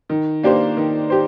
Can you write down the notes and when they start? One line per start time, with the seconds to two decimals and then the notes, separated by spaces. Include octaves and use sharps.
0.10 D#3
0.43 A#3 D4 G4 C5
0.77 D#3
1.10 G4 C5